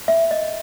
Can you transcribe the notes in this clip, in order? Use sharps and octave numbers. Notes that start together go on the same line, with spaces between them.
E5
D#5